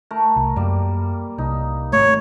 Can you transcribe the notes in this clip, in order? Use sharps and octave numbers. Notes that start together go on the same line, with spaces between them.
A3 A#4
C2
F#2 G3 A#3
C2 D#4
G#1 A3 C#5